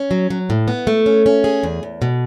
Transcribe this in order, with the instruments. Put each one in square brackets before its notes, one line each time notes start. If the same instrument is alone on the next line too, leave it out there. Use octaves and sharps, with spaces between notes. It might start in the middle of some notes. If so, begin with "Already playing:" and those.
Already playing: [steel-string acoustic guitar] C#4
F#3
F#3
A2
B3
A3
C#4
C#4
G#4
E2
E2
B2